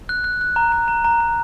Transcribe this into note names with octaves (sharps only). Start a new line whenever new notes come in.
F#6
F#6
F#6
A#5
A#5
A#5
A#5
A#5